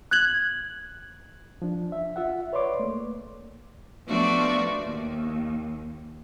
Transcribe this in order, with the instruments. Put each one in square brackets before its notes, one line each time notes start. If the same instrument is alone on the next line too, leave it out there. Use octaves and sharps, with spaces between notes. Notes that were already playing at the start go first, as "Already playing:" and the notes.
[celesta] F#6 G#6 F#7
[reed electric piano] F3 D4
E5
F4 E5 F#5
B4 C#5 D5 C6 D6
A3 A#3
[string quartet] F3 A3 B3 D4 F#4 D5
D#2